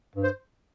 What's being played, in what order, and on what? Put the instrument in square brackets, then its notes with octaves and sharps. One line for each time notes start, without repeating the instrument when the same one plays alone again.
[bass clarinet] G2
[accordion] C5